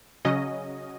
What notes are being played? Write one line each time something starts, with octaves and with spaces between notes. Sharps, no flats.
C#3 F#3 C#4 D#5